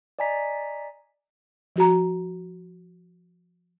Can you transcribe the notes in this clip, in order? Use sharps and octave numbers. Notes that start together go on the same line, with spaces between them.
D5 D#5 G#5 A#5 B6
F3 F#4 A#5